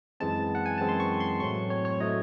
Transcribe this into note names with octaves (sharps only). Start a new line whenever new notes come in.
F#2 E3 G#3 C4 A5
F#5
G#5
F#2 E3 G#3 C4 A5
C6
C#6
C6
A2 F#3 A3 C4 C#6
C#5
C#5
A2 F#3 A3 C4 D#5